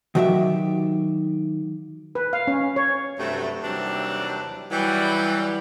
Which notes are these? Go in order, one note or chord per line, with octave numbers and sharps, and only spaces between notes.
D#3 F#3 F#4 G4 E5
B4
F5
C#4
C#5
G2 C3 F#3 A3
D#2 C3 E3 F#3 G3 D4
E3 F#3 G3